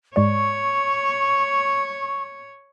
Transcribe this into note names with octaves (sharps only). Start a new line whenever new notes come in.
G#2 G#3 C#5 D5 C#6